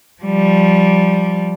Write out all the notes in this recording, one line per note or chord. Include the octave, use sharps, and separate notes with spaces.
F3 G3